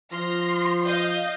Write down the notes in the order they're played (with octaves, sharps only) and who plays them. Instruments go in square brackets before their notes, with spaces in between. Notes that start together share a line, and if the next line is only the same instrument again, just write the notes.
[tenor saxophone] F3 [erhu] C6 [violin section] F6 A#6
[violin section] D#5 F5 G6